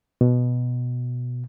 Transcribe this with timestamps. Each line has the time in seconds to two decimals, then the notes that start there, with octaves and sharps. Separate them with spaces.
0.21 B2